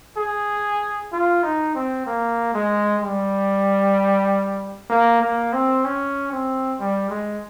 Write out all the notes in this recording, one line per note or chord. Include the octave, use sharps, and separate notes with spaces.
G#4
F4
D#4
C4
A#3
G#3
G3
A#3
A#3
C4
C#4
C4
G3
G#3